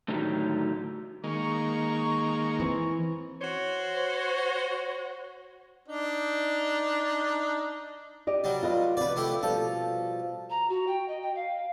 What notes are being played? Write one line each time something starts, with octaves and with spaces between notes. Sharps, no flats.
A2 D3 D#3 F#3 G4
D#3 G#3 A#3 A#5 C#6
E3 C4
F#4 C5 C#5
D4 D#4
G4 D5 D#5
F#3 G3
F4 B4 D#5
F3 C4 B4 D5
A3 E4 G4
B2 F3 G3 A4
A#5
F#4
G5
D#5
G5
F5